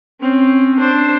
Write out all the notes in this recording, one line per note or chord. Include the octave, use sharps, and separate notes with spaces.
C4 C#4
D4 C5